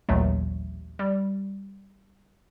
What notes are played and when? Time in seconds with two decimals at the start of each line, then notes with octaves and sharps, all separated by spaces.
0.09 A1 D#2 A#2 F#3 A3
0.99 G3